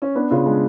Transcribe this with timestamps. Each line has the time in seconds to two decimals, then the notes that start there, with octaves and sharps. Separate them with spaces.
0.02 C#4
0.15 B3 D4
0.30 C#3 F4
0.46 G#3 D4